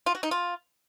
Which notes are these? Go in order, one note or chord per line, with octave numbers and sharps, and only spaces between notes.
F4
F#4
D#4
F4